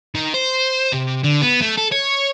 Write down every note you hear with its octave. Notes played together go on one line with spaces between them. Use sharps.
D#3
C5
C3
D3
B3
A3
A4
C#5